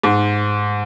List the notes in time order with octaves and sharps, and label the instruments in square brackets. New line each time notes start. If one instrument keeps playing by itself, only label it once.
[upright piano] G#2